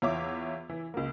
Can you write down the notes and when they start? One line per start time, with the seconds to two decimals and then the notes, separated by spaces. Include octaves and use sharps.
0.02 E2 F4 C#5 E5 D6
0.69 E3
0.94 C#2 A#3